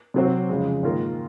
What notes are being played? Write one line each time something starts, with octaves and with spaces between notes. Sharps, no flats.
C3 F#3 C4 F#4 C5
F2 C#3 G#3
G#2 D#3 A#3 F4 A#4